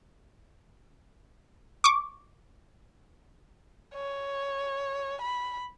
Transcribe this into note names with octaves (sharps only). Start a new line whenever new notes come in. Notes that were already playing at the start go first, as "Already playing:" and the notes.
C#6 D6
C#5
B5